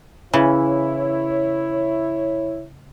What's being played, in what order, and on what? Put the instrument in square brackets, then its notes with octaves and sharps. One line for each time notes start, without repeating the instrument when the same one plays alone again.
[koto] C#3 [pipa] E3 [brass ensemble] E4 C#5